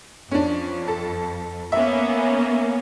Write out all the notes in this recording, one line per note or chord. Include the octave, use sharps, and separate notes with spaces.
F2 C#4 D4
A4
A#3 B3 C#4 E5